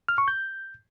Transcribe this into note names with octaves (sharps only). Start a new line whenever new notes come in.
F6
C#6
G6